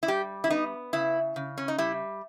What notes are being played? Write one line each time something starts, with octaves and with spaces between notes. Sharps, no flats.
E4
G3 G4
E4
B3 D#4
C#3 E4
C#3
C#4
D#4
G3 E4